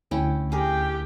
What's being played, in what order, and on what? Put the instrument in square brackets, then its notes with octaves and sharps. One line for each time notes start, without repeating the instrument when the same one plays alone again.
[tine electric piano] D2 [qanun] C#4 E4 G5
[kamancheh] G4 G5 [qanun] G#4 A#4